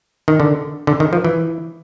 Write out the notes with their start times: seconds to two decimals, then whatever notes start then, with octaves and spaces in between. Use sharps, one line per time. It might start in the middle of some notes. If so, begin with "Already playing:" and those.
0.28 D#3
0.40 D3
0.87 D3
1.00 D#3
1.13 F3
1.25 E3